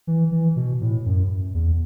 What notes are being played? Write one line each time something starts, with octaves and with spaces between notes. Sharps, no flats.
E3
E3
B2
A2
F#2
E2